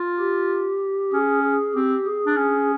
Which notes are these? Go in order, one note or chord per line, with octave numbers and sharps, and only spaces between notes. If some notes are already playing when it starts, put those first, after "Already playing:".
Already playing: F4
G4
C#4 G#4
G#4
C4 G4
G#4
D4
C#4